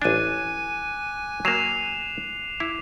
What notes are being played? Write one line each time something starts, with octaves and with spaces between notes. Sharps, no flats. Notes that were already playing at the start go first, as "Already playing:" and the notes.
A1 D4 G#5 D6 F#6 D#7
F#3 A#3 C7 E7 F7
E4 D6